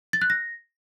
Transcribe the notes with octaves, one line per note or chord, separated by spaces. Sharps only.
A6
F#6
A#6